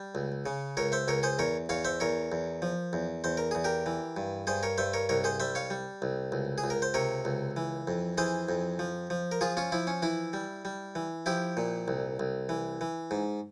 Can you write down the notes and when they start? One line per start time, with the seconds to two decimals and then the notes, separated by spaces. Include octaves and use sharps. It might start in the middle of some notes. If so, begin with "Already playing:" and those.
Already playing: G3
0.15 C#2
0.46 C#3
0.77 C#2 A#4 C#5
0.92 C5 E5
1.08 C#2 A#4 C#5
1.23 G#4 C5
1.39 E2 A#4 C#5
1.69 E2 C#5 F5
1.85 C5 E5
2.00 E2 A#4 C#5
2.32 E2
2.62 F3
2.93 E2
3.24 E2 C5
3.37 A#4
3.51 E2 G#4
3.64 G4 A#4
3.86 E3
4.17 G2
4.47 G2 G#4 C5
4.63 A#4 C#5
4.78 G2 C5 E5
4.94 A#4 C#5
5.09 C2 A#4 C#5
5.24 G#4 C5
5.40 G3 C5 E5
5.55 C#5 F5
5.70 G3
6.02 C2
6.32 C#2
6.58 G#4
6.64 C#2
6.70 A#4
6.82 C5
6.94 C3 A#4 C#5
7.25 C#2
7.57 E3
7.87 F2
8.18 E3 G#4 C5
8.49 F2
8.79 F3
9.10 F3
9.32 A#4
9.41 F3 F4 G#4
9.57 C#4 F4
9.72 F3 E4
9.87 C#4
10.02 E3 E4
10.33 G3
10.65 G3
10.95 E3
11.26 F3 E4 G4
11.57 A#2
11.88 C2
12.20 C2
12.49 E3
12.81 E3
13.11 G#2